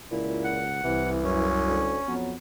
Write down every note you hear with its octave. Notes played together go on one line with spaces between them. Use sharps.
C#2 A#2 E4
F#5
C2 C3 E3
F#2 C#4
D2
F2 F#3 B3